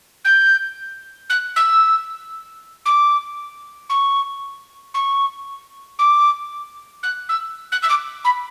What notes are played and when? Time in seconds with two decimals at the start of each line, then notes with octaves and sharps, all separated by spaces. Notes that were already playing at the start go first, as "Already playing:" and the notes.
0.24 G6
1.29 F#6
1.56 E6
2.85 D6
3.89 C#6
4.94 C#6
5.99 D6
7.03 F#6
7.29 E6
7.72 F#6
7.82 E6
7.89 D6
8.24 B5